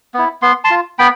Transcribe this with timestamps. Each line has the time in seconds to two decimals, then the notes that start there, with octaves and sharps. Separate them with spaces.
0.14 B3 E4
0.42 B3 C6
0.64 A5 C6
0.70 F4
0.99 B3 G5 B5